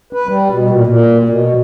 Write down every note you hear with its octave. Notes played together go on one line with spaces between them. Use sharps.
B4
G3
B2
A#2
A#2
B2